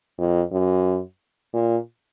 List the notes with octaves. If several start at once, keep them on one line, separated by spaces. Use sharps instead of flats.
F2
F#2
A#2